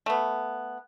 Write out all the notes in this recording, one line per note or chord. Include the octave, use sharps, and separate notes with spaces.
A3 B3